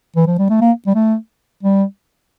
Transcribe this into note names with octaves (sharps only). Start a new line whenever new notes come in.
E3
F3
G3
A3
A#3
G3
A3
G3